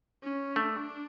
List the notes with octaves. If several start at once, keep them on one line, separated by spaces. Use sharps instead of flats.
C#4
A3 D4